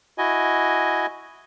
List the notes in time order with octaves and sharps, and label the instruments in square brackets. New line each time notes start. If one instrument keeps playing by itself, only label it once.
[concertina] E4 F#4 D#5 G#5